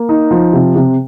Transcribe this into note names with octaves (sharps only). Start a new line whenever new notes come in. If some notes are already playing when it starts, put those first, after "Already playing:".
Already playing: A#3
D#4
F3
C3
C3